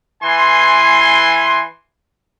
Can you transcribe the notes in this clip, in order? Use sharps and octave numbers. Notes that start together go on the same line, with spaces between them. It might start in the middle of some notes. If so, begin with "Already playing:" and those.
E3 G#5 C6